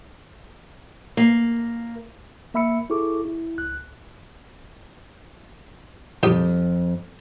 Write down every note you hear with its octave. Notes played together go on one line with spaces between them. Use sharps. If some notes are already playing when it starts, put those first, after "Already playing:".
A#3
A#3 E5 B5 E6 C#7
E4 G#4 A4 C#6 D6
E4
C#2 F#6
C2 F2 G4 D#6